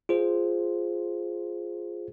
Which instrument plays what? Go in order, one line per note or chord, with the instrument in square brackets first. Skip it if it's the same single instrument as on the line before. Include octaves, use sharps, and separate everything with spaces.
[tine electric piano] F4 G#4 C5